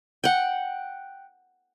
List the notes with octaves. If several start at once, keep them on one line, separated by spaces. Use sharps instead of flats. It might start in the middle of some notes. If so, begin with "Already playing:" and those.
F#5 G5